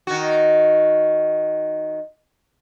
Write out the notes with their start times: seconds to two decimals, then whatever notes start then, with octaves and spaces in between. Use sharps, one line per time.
0.07 D#3 F#4